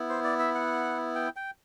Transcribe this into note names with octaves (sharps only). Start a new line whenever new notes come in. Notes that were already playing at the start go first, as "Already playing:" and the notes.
Already playing: B3 E4
C5
D5
E5
F#5
G5
G5